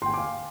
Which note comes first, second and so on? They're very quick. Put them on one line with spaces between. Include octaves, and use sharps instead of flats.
C6 G5 G#5 D6 F5